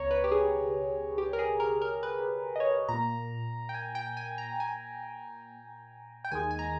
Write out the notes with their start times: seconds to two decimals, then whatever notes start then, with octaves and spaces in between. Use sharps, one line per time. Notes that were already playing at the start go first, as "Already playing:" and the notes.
Already playing: C#2 B2 C#5 A#5
0.11 B4
0.24 G4
0.32 G#4
1.18 G4
1.33 A#4
1.39 G#4
1.60 A#4
1.82 A#4
2.03 B4
2.56 D#5
2.60 C#5
2.88 A#2 A#5
2.94 A#3
3.69 G5
3.74 G#5
3.95 G5
4.17 G#5
4.38 A#5
4.60 G#5
6.25 G5
6.32 D#2 D#3 G#3 G#5
6.51 G#5
6.59 A#5